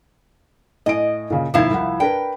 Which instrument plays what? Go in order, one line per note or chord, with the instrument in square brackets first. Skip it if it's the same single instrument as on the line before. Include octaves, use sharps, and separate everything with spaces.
[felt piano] A2 G#5 D7 [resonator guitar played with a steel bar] D#5
[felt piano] A#2 C#3
[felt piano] E1 D#2 G#6 [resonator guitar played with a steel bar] F3 E4 F5
[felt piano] C2 F#5
[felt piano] D4 A#4 B4 [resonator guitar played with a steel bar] G5